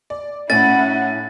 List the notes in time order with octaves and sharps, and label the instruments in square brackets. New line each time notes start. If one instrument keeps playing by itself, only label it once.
[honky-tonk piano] D5
[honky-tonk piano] A2 C#4 [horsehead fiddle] E4 F#5 [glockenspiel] A6